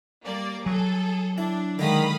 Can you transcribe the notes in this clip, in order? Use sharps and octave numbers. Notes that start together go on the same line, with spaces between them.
G3 A#3 D5
F#3 G#4 A4
D4 E4
D3 D#3 G#3 F5 B5 D#6